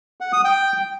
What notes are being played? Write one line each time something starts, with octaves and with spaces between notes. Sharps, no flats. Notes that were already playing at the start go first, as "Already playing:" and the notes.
F#5
D#6
G5